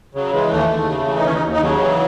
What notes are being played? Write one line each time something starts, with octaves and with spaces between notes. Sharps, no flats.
C#3 F#3
E3 G#3
D#2 A3
D#2
C#3
E3
D#4
D#2 C#4
D#4
D#2
D#4
C#3 F#3
E3